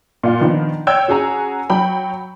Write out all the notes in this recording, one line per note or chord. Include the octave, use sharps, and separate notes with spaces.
A#2 F4
D#3 F3 B3 D4
C#5 G5 E6 G#6
C#4 F#4 G#4 F#5 G#5 A#5
F#3 G5 B5